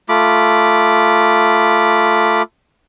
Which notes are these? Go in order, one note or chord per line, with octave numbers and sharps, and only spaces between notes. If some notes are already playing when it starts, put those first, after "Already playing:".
A3 F4 B5 D6